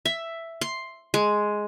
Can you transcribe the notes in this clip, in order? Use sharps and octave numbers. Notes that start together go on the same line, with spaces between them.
E5
C6
G#3